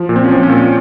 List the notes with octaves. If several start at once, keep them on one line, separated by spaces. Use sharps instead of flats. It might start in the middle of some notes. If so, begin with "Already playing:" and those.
Already playing: F3
A#2
C4
C#4
F3 C4
C#4
A#2